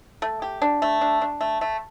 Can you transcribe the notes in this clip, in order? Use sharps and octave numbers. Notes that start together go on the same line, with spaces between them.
A3
G4
D4
A3
D4
D4
A3
A3